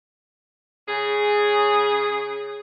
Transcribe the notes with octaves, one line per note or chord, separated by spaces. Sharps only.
C#3 G#4